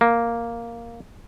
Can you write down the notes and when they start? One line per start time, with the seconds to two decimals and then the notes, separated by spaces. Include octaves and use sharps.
0.01 A#3